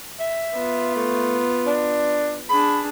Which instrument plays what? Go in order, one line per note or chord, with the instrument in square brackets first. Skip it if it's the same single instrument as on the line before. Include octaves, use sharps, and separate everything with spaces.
[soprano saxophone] E5
[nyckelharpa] B3 F4
[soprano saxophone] A3
D4
[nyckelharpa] D4 G#4 [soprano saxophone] B5